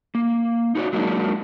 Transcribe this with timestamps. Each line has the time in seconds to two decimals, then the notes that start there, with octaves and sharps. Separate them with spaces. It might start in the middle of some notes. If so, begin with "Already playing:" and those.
0.15 A#3
0.75 D#4 F#4 A4 C#5 D5
0.93 F#3 G#3 A#3 D4 D#4